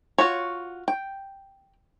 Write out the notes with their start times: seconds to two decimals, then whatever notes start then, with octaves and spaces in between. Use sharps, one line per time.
0.18 F4 F#4 C#5
0.88 G5